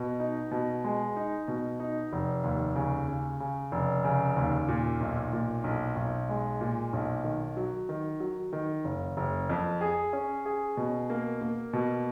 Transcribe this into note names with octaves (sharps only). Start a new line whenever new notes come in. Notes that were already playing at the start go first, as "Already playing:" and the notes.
Already playing: B2
D#4
B2
G#3
D#4
B2
D#4
F1
D#2
C#3
C#3
C#3
F1
C#3
D#2
A#2
B1
A#2
B1
B1
G#3
A#2
B1
D#3
F#3
D#3
F#3
D#3
F#1
F#1
F2
G#4
C#4
G#4
B2
A#3
A#3
B2